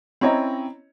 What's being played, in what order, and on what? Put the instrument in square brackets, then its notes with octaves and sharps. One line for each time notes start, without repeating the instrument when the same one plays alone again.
[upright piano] C4 C#4 E4 C#5 D#5 A#5